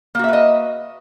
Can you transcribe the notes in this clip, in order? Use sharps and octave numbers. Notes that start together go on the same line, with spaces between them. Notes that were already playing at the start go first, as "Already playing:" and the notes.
A#3 F#4 B4 D#5 E5